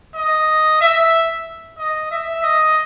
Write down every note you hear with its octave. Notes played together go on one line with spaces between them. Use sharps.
D#5
E5
D#5
E5
D#5